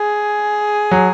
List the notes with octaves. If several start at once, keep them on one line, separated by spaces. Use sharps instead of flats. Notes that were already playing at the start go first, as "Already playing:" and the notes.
Already playing: G#4
F#3